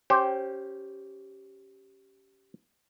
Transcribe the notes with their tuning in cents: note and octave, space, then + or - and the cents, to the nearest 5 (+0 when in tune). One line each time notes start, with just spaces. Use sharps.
C#4 +0 G4 -10 C5 +10